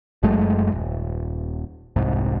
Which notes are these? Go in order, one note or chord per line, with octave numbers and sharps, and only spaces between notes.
F#1 F#2 G#3 A3
D#1
F1 C2 G#2